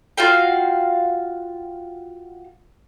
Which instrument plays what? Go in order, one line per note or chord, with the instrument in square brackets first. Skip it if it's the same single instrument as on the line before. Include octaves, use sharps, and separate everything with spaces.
[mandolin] F4 F#4 F5 G5